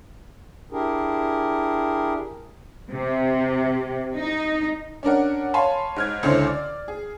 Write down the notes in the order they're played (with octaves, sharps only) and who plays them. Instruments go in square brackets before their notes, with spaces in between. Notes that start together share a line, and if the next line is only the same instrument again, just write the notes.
[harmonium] D4 E4 G4 G#4 A#4
[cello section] C3
D#4
[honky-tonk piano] C#4 D4 A#4 F#5
C#5 F5 G#5 A5 B5 C6
G#2 F6 G#6
C#2 D3 E4 C5 C#5 F6
D5
G#4